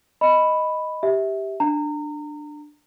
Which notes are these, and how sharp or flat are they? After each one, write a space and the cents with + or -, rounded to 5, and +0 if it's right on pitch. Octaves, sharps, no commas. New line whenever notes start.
D#5 +0 B5 +0
G4 +0 E5 -20
D4 +15 A#5 -30